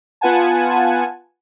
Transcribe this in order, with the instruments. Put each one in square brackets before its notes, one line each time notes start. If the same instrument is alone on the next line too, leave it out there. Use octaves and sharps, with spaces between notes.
[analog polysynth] B3 F4 B4 F#5 G#5 A5